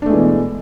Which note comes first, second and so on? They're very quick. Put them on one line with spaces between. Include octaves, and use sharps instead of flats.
D4 A3 G#3 E3 B2